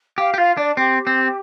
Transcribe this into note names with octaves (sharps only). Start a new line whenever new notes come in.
G4 F5
G4
F4 F5
D4 D5
C4 G4
C4